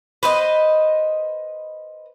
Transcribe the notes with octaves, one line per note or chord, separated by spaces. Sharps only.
B4 C5 D#5